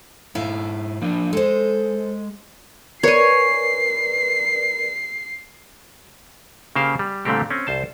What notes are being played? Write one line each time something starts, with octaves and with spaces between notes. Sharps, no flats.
G#2 E4 E5 F5
F3 A#3 D4
G#3 A4 C5
A#4 B4 C#5 D5 G#5 C7
C#3 A#3 G4 C5 F5
G3
A#2 D3 G3 A3 C4 G4
C4 C#4
C2 C5 A5